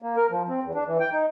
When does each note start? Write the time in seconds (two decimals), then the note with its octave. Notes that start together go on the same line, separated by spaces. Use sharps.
0.02 A#3
0.17 A#4
0.30 F3
0.49 C4
0.63 E2
0.75 D4
0.87 E3
1.00 G5
1.13 D#4